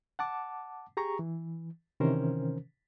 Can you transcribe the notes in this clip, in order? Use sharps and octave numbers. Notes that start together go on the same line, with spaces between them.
F#5 A5 D6
G4 G#4 A#5 C#6
E3
C3 D#3 E3 C#4 A#4 C5